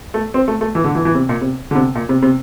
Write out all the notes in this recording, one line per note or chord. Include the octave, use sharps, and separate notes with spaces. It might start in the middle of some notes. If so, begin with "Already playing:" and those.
A3
C4
A3
A3
E3
D3
E3
E3
C3
A#2
C3
D3
C3
A#2
C3
C3